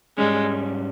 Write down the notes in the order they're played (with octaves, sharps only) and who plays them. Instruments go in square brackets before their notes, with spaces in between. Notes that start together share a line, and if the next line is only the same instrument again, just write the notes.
[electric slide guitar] G#2 G3 C#4 [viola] G#3